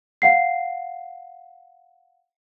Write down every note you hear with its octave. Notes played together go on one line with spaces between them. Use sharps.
F5 F#5 C7